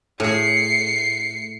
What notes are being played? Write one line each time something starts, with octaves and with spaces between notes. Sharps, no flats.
A2 A3 G#4 C7 C#7